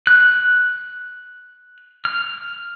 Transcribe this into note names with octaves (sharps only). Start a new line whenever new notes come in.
F#6
F6